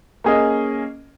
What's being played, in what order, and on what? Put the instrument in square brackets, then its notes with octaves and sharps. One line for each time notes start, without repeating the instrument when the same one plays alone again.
[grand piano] A#3 C#4 G#4 D#5